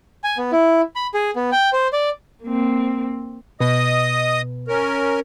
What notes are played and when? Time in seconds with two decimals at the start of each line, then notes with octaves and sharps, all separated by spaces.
0.24 G#5
0.38 B3
0.52 E4
0.96 B5
1.14 G#4
1.36 B3
1.52 G5
1.73 C5
1.93 D5
2.44 A#3 C4
3.61 B2 D#5 D#6
4.68 C#4 A#4